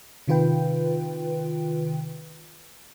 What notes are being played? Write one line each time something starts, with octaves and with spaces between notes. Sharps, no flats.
C3 D#3 F4 B4 G5